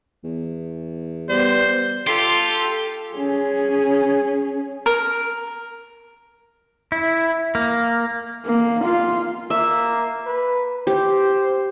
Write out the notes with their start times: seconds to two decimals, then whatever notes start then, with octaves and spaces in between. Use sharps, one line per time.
0.24 E2
1.29 G3 B3 C5
2.07 F4 G4 A4 C6
3.15 C#4 G#4
4.86 A#4
6.92 E4
7.55 A#3
8.46 A#3
8.85 F4
9.50 A#3 E5
10.26 B4
10.87 G4 C5